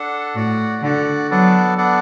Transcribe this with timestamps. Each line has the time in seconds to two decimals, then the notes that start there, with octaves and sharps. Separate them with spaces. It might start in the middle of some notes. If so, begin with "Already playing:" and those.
Already playing: D4 A4 F#5
0.35 A2 F#4 D5 F#5
0.83 D3 F#4 D5 F#5
1.30 F#3 B3 D4 A4 D5 F#5
1.78 B3 D4 A4 D5 F#5